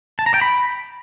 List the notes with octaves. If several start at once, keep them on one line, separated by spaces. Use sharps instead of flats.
A5
A#5
G5
B5